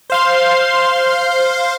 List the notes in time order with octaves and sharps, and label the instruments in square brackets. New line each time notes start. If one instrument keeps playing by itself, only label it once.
[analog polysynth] C5 F5 C6